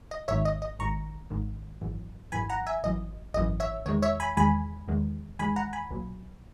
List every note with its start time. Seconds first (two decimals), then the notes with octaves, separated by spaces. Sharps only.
0.11 D#5
0.28 G#1 G#2 D#3 C#5 E5
0.45 D#5
0.62 D#5
0.79 G#1 G#2 D#3 A#5 C#6
1.30 G#1 G#2 D#3
1.81 G#1 F#2 E3
2.32 G#1 F#2 E3 G#5 B5
2.49 F#5 A#5
2.67 E5 G#5
2.83 G#1 F#2 E3 D#5
3.34 G#1 F#2 E3 D#5
3.60 C#5 E5
3.86 E2 D#3 G#3 C#5
4.02 C#5 E5
4.20 G#5 B5
4.37 E2 D#3 G#3 G#5 B5
4.88 E2 D#3 G#3
5.39 E2 D#3 G#3 G#5 B5
5.56 F#5 A#5
5.73 G#5 B5
5.91 B1 A#2 F#3